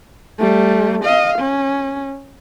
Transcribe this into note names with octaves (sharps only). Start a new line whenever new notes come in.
G3 A3
D#5 F5
C#4